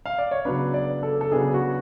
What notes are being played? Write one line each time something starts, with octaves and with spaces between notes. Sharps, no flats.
F5
D5
C#5
C#3 F#3 B3 D4 B4
D5
A4
A4
C#3 F#3 B3 D4 G#4
F#4